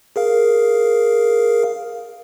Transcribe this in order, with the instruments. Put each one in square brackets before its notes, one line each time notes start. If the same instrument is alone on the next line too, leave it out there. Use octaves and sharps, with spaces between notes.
[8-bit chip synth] G#4 A#4 F5